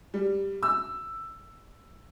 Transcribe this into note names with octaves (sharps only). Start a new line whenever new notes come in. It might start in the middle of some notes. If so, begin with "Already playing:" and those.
G3
E6